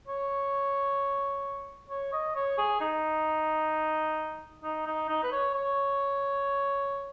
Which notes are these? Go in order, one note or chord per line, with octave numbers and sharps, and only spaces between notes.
C#5
C#5
D#5
C#5
G#4
D#4
D#4
D#4
D#4
B4
C#5
C#5